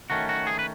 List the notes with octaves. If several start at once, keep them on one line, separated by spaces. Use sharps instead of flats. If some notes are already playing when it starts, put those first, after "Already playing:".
D#3 A3 C#4 F#4
F#4
G#4
B4